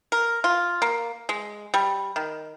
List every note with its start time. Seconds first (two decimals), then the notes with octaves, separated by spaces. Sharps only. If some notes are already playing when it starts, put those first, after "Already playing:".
0.12 A#4
0.44 F4
0.82 A#3
1.29 G#3
1.74 G3
2.16 D#3